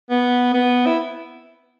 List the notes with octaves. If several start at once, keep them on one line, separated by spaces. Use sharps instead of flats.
B3
B3
E4